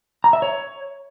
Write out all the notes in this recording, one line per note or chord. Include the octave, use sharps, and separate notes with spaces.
A#5
E5
C#5